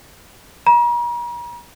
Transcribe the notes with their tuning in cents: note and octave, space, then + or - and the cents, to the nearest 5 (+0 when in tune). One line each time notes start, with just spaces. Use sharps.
A#5 +40